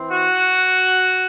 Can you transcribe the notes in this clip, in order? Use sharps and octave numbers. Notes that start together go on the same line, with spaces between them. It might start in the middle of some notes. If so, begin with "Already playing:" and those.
Already playing: E3 C4
F#4